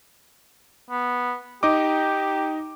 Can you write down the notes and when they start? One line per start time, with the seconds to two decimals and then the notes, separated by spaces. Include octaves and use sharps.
0.90 B3
1.63 D#4 G4 D#5 D6